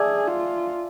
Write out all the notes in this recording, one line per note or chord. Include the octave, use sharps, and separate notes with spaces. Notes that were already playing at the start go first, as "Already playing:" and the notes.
Already playing: G#4 D5 E5 G#5 A5 D6 E6
F4